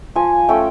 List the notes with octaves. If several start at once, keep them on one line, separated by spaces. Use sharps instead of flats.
F3 G#5
A3 C#4 G5